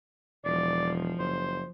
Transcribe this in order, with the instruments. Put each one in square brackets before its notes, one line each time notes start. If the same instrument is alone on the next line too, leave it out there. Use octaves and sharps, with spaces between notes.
[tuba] E1 [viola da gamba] F3 [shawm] D5
[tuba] F#1 [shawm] C5